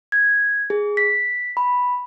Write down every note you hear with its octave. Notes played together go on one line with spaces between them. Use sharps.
G#6
G#4
B6
B5